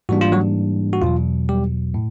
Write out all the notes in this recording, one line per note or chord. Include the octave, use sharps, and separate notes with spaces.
G#2 E3 G3 A#3 D4 F#4
F4
F#3 F#4
F#4
E2 B2 F#3 F4
G3 G4
A2